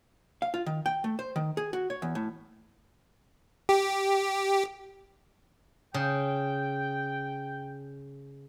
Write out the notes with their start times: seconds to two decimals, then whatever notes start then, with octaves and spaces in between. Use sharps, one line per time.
0.42 F5
0.54 F4
0.66 D#3
0.86 G5
1.04 A3
1.19 C5
1.36 D#3
1.57 G#4
1.73 F#4
1.90 C#5
2.02 E2
2.15 A2
3.69 G4
5.94 C#3 G5